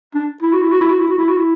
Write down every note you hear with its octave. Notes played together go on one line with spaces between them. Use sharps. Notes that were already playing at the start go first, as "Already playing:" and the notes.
D4
E4
F#4
E4
F#4
E4
F#4
E4
F#4
E4
F#4
E4